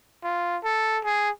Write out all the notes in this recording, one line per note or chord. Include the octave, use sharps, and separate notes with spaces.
F4
A4
G#4